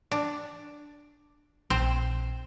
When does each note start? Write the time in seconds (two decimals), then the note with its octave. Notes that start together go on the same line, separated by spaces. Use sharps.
0.12 D4
1.70 A#1 C4 C5